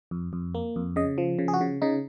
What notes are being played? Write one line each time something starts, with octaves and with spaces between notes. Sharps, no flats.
F2
F2
A#3
F2
C#3 D#5
F3
C#3
G#4
F#4
C#3
C#3 D#4